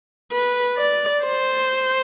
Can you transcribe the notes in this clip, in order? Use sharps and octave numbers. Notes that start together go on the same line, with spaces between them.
B4
D5
C5